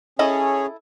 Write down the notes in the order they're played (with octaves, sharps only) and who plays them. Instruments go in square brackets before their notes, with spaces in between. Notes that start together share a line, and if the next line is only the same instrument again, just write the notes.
[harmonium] C#4 G#4 C#5 [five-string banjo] E4 A4 D#5